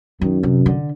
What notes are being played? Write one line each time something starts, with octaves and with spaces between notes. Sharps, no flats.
F#2 D#3
C3
D3